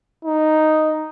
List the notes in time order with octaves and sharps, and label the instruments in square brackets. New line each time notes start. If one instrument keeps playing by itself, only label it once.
[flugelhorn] D#4